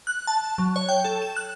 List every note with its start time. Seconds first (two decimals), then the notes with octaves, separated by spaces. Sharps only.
0.07 F#6
0.27 A5
0.58 F#3
0.76 C#5
0.89 G5
1.05 A4
1.22 E7
1.36 F#6